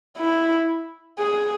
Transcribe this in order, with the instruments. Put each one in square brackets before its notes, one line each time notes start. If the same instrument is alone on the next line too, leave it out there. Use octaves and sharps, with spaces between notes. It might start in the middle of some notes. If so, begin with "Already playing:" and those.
[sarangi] E4
G#4